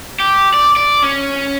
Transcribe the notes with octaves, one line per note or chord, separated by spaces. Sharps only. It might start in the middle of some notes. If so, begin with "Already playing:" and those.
G4
D5
D5
C#4